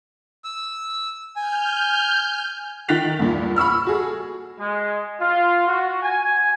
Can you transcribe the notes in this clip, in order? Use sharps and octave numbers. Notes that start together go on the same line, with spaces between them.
E6
G#5 F6 G6
D#3 G5 F#6 A6 B6 F7
E2 G2 A#2
B5 C#6 E6 F6
F#4 G#4 A4
G#3
F4
F#4
G#5